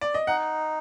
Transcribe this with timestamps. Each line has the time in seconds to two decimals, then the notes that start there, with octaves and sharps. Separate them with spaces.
0.01 D5
0.14 D#5
0.27 D#4 F#5